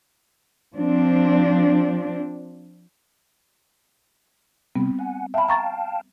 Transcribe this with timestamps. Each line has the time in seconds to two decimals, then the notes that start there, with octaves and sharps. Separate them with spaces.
0.75 F3 C4 D4
4.75 C3 G3 B3 C4
4.99 F#5 G#5
5.34 E5 F5 G5 A5 B5
5.49 A#5 C#6 A6